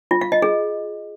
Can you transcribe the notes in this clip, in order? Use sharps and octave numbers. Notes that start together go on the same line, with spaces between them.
F4
F5
D#5
G#4